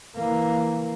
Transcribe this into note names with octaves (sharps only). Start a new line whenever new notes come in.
E3 A#3